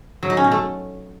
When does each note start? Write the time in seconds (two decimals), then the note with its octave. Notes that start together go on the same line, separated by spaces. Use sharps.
0.23 F#3
0.30 D#4
0.37 C#4
0.44 B2
0.52 A3